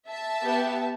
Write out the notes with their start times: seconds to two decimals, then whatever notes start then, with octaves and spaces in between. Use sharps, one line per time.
0.09 E5 A5
0.44 B3 G4